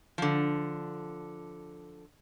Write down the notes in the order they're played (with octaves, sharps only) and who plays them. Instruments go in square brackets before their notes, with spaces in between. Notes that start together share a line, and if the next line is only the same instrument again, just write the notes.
[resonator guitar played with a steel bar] D3 F3